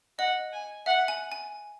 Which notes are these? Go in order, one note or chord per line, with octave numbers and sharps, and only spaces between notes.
D#5 F#5
G#5
E5 F#5
G#5
G#5